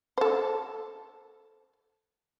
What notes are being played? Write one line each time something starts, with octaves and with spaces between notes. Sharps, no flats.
A4 C5